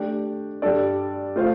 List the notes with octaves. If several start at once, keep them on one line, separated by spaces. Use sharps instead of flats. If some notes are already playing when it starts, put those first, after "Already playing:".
Already playing: A3 D4 G4
G2 G3 D4 A4 D5
A3 F4 C5 F5